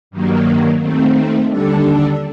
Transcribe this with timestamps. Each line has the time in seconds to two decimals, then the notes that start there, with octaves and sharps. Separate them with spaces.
0.11 G2 D#3 F#3 A#3
0.81 D#2 D#3 A3 C4
1.49 D#2 D3 G3 D4 A4